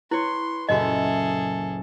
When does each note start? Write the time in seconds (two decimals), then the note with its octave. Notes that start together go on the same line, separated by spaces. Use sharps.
0.11 E4 B4 C#5 C6
0.69 F#1 A#2 F#4 G#4 A4 D#5 E5